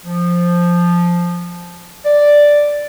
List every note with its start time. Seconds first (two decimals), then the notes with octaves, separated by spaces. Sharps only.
0.05 F3
2.05 D5